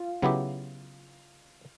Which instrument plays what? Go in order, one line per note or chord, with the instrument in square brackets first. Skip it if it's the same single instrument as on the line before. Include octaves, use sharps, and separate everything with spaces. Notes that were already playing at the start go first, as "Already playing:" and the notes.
Already playing: [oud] F4
[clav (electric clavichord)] C#3 F#3 B3 E4 G4